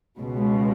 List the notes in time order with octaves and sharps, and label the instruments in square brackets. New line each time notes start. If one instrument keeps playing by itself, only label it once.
[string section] C#2 B2